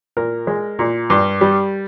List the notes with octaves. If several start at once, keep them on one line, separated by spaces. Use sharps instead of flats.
A#2 A#4
G#3
A#2
G2
G3